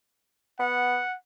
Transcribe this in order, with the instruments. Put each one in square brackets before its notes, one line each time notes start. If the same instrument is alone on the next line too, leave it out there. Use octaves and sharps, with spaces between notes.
[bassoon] B3 [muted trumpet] F#5